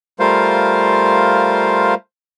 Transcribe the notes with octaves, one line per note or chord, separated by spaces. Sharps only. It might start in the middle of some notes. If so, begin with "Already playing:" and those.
G3 A3 F4 A#4 C5 F5